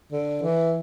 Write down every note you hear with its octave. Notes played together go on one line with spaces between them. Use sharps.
D3
E3